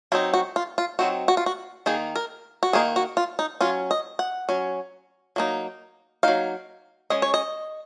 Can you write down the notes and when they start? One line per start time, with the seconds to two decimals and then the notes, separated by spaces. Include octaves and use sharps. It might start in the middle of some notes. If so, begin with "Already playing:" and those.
0.12 F#3 C4 D#4 F4
0.34 F#4
0.56 F4
0.78 F4
0.99 F#3 C4 D#4 F#4
1.28 F#4
1.37 F4
1.46 F#4
1.86 D#3 A#3 D#4 G#4
2.16 A#4
2.63 F#4
2.73 D#3 A#3 D#4 G#4
2.96 F#4
3.17 F4
3.39 D#4
3.61 F#3 C#4 F4
3.91 D#5
4.19 F#5
4.49 F#3 C#4
5.36 F#3 A#3 D#4
6.23 F#3 A#3 D#4 F5
7.10 G#3 C#4 D#5
7.22 C#5
7.34 D#5